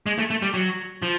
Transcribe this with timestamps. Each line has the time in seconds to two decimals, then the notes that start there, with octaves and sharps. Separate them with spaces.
0.06 G#3
0.18 A3
0.30 A3
0.42 G3
0.54 F#3
1.02 F3